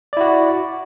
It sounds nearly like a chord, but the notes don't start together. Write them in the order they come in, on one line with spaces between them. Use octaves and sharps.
D5 E4 F#4